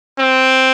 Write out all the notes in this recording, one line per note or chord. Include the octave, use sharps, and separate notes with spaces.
C4